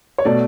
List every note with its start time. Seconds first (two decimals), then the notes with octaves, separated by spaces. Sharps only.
0.18 C#5
0.25 B2 A3 D5